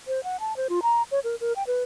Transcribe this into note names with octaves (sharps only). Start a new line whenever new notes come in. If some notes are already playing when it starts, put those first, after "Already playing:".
C5
F#5
A5
C5
F4
A#5
C#5
A#4
A#4
G5
B4